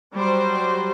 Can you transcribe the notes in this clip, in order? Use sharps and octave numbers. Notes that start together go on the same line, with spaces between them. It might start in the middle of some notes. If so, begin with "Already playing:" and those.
F#3 G3 C5